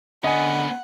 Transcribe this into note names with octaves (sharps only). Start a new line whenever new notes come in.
D3 B3 C#4 D#5 F#5 G#5